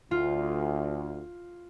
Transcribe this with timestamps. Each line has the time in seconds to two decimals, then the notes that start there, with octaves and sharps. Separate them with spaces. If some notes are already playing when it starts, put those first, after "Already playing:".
0.11 D2 F4